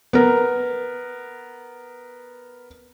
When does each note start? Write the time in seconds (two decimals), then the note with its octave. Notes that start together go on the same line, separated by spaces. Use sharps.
0.13 B3 A#4